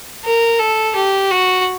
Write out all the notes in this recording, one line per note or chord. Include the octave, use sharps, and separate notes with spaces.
A#4
A4
G4
F#4